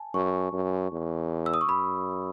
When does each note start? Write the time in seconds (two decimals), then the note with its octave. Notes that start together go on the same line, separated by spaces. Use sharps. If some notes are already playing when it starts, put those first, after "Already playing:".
Already playing: G#5 A5
0.14 F#2 C#6
0.52 F#2
0.92 E2
1.46 E6
1.54 D#6
1.61 C#6
1.69 F#2 B5